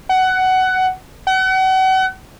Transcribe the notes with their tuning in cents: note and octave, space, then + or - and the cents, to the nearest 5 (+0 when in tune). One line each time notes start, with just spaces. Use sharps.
F#5 +15
F#5 +35